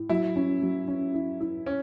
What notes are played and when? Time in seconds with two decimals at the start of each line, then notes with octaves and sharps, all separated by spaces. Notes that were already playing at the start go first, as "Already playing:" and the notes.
Already playing: A2
0.09 F#3 E4
0.36 C#4
0.62 F#3
0.88 C#4
1.14 E4
1.40 E4
1.66 C#4